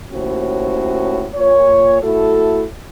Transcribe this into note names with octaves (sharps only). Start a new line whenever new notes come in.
D#2 A2 C#4 F#4 C5
A#2 C#5
A3 E4 F#4 A4